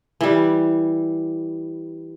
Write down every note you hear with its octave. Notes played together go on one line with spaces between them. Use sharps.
E3 G3